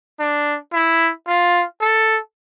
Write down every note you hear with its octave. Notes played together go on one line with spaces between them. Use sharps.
D4
E4
F4
A4